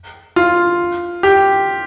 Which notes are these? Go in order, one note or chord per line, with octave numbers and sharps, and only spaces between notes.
F4
G4